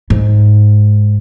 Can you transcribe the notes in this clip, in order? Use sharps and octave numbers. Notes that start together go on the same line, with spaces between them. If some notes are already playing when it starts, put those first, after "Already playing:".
G#2